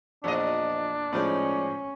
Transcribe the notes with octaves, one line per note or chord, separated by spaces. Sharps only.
E2 A#2 F3 D4 D#5
A2 F3 G#3 C#4 D#4 D5